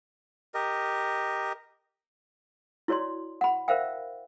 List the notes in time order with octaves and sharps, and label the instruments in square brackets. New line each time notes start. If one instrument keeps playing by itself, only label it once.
[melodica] G4 A#4 D#5
[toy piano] E4 F#4 C#5 D5 C6
F#5 B5
A#4 C5 E5 F5 G5